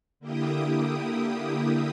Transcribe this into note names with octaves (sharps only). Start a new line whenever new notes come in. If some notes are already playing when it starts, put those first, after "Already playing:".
D3 A#3 E4 G4 G5 D#6